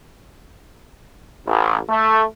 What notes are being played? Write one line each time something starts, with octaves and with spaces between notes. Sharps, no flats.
A1
A3